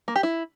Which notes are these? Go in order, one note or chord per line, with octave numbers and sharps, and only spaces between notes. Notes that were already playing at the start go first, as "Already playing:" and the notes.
A#3
G4
E4